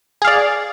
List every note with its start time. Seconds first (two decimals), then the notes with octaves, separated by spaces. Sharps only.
0.22 G#4
0.24 F5
0.27 D5